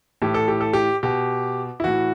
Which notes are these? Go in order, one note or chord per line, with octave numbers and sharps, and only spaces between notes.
A2 E3 G4
A4
G4
A4
G4
B2 G4
E4
A2 E3 F#4